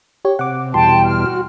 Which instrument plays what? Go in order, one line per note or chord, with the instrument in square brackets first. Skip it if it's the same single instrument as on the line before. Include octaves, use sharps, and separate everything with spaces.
[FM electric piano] G4 C#5
[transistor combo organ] C3 [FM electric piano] F#5 D6
[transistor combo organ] E2 B2 G3 [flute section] G5 A5 [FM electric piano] C6
[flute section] F6
[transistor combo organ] F#4